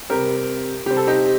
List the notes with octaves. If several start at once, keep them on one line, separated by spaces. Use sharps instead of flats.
C3 G3 C4 G4 A#4
C3 G3 C4 G4
A4
D#4 G4